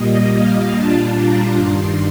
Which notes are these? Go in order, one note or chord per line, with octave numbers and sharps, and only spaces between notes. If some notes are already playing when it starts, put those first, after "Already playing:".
Already playing: A#2 G3 A#3 D#5
F5
A#2 G3 D4 F4 A5
A#5
G2 D#3 G3 C6